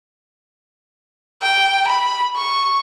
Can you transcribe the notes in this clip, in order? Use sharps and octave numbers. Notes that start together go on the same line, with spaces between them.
G5
B5
C#6